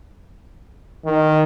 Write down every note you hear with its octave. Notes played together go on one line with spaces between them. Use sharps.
D#3